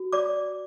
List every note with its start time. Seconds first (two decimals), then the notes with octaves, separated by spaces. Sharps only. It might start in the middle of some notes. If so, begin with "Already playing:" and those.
Already playing: F#4
0.12 D5 D6